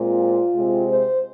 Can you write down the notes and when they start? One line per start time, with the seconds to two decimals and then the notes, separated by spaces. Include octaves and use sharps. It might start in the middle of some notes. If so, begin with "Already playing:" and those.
Already playing: A#2 G#3 C4 F4
0.54 C3 G#3 C4
0.86 C5